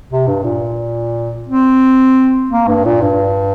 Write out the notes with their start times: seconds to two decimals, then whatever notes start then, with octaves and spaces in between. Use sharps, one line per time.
0.10 C3
0.27 G2
0.44 A#2
1.48 C4
2.51 A#3
2.68 G2
2.85 A#2
3.02 G2